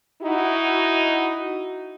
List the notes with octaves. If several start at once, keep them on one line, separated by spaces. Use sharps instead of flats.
D#4 E4 F#4